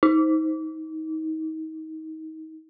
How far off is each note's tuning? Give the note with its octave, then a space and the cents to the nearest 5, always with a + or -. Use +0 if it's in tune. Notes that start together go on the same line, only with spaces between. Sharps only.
D#4 +30